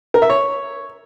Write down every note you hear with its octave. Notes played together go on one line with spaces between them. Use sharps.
A#4
E5
C#5